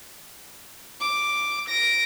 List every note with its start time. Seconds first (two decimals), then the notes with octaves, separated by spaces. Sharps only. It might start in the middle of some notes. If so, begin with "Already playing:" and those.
1.01 D6
1.69 A#6 D7